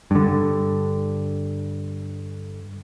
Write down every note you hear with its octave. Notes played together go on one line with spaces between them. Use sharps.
G2 D3